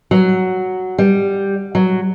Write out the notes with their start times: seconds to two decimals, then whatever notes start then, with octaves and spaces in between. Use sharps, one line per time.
0.11 F#3
0.98 G3
1.75 F#3